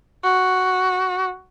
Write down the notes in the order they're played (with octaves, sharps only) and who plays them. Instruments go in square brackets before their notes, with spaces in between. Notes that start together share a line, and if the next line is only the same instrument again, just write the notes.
[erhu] F#4